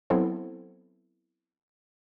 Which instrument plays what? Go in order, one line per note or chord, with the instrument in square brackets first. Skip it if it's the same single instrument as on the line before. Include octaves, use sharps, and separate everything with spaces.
[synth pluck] F#3 B3 C4 E4 A4 C5